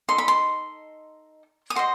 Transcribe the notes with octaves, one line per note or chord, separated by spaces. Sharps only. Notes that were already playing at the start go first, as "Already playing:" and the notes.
D#4 A4 D#5 C6
B5
C6
D#6
F#4 C5 D#5 C6